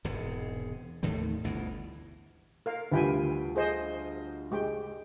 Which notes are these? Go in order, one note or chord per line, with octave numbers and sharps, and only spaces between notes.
E1 E2 G#2 C3
D#2 A2 D#3 A3
G1 D2 B2 E3
A#4 F5
D2 G3 F4 B4 G5 G#5
G#4 C5 D#5
G#3 G4 G5